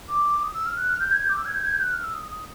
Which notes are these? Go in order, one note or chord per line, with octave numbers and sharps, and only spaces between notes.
D6
D#6
E6
F6
F#6
F6
G6
G#6
G6
D6
E6
G#6
G6
G#6
G6
F#6
F6
E6
D#6
D#6